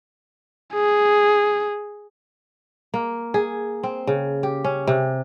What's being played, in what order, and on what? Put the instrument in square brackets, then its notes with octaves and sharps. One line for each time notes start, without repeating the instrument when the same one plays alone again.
[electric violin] G#4
[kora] A#3
G#4
C4
C#3
G4
C#4
C3